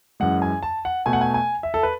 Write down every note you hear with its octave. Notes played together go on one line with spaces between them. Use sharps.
F#2 E3 G#3 F#5
G#5
A5
F#5
B2 A3 G#5
F#5
G#5
G#5
E5
A4
B4